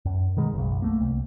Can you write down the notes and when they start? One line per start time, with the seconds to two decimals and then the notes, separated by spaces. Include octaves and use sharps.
0.05 F#2
0.37 B2 D#3 G#3
0.54 F#1 B1
0.82 A3 A#3
1.00 C2